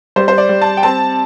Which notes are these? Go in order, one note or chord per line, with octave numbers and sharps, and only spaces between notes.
G3 C5
C5
D5
G3
A5
G5
C4 A5